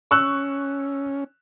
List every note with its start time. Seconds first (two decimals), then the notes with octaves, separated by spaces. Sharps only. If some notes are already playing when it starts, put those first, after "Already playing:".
0.11 C#4 C#6 E6 F#6